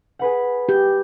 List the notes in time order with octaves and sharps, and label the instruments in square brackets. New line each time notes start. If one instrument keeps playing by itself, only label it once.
[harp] G#4 B4 F#5
[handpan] G4 [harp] G6